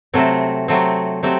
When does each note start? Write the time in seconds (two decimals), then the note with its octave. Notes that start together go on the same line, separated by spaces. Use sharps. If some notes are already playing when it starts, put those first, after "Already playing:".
0.14 C3 F#3 A3 C4
0.68 C3 F#3 A3 C4
1.23 F#3 A3 C4 G4